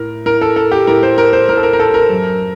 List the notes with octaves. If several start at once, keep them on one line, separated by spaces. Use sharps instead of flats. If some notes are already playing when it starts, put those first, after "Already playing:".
Already playing: A2 A#4
A2 A#4
A4
A4
G4
A2 A#4
C5
A#4
C5
A2 A#4
A4
A#4
A#4
A4
A#4
F#2